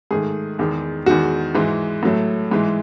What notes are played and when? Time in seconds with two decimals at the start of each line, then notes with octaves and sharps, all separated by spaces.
0.11 G#2 D#3 A3 G#4
0.59 E2 D#3 G#3
1.06 E2 D#3 G#3 F#4
1.54 G#2 E3 G#3
2.03 A2 F#3 A3
2.51 G#2 E3 G#3